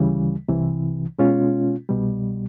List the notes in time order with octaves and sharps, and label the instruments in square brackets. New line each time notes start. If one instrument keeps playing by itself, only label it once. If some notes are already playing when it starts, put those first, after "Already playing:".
Already playing: [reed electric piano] D2 C#3 E3 G3
C2 C3 E3
B2 G#3 C#4 F4
C2 B2 G3